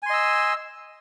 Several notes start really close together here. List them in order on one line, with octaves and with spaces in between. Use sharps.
G#5 C6 D#5 E6